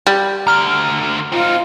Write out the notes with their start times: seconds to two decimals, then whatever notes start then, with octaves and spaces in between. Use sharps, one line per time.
0.07 G3
0.47 D2 D3 A#5 F6
1.32 C4 D#4 F4